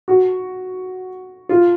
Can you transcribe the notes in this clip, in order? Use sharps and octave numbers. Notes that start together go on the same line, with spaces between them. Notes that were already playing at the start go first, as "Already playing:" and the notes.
F#4
F4